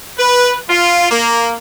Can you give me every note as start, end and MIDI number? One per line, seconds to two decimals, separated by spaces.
0.19 0.56 71
0.69 1.11 65
1.11 1.55 58